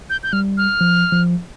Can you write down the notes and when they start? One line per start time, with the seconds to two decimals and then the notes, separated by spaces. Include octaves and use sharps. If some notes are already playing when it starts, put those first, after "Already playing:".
0.10 G6
0.23 G6
0.33 G3 F6
0.58 F6
0.81 F3
1.12 F3